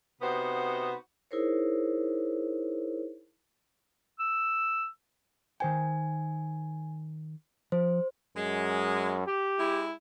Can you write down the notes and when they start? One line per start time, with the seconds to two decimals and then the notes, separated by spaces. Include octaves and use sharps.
0.22 C3 B3 D#4 F#4 C5
1.31 D#4 E4 G#4 A#4 C5 C#5
4.19 E6
5.60 D#3 C5 G5 G#5
7.72 F3 C5
8.37 F#2 G#3
9.27 G4
9.60 G#3 E4